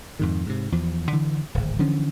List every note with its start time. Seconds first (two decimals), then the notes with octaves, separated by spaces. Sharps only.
0.19 F2 G#2 D#3
0.47 G#2 C3
0.72 E2 F3
1.12 D3 E3
1.54 D1 G#1
1.79 D3 E3 F3 C#4